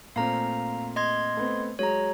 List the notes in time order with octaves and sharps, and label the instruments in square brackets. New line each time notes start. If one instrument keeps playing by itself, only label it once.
[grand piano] A#2 A3 C4 [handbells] F5 A#5
[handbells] D#5 C6 G#6
[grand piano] A3 B3 C4
[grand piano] F#3 G#3 [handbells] C#5 A#5